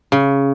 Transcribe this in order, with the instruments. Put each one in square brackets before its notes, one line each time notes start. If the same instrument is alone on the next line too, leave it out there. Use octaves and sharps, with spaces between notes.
[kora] C#3